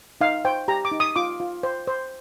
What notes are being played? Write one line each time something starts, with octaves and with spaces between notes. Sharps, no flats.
D#4 F5
C5 G5
G4 A#5
D6
D#4
D#6
F4 D6
F4
C5
C5